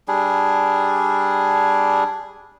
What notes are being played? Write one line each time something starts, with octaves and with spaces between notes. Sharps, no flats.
G3 D4 G#4